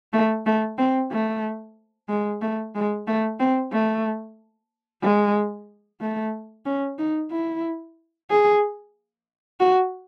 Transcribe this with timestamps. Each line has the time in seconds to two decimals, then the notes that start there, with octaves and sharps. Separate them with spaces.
0.13 A3
0.46 A3
0.78 C4
1.12 A3
2.09 G#3
2.42 A3
2.75 G#3
3.07 A3
3.40 C4
3.72 A3
5.03 G#3
6.01 A3
6.65 C#4
6.99 D#4
7.31 E4
8.30 G#4
9.60 F#4